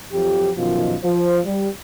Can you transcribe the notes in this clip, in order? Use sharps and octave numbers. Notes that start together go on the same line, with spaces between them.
F2 F3 F#3 G4
F#2 B2 D#3 F3 F4
F3 F4 C5
G3